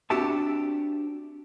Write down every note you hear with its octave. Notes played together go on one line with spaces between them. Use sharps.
C4 D4 F#4 G4 E5 A5